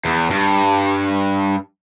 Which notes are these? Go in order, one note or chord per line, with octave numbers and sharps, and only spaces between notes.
E2
G2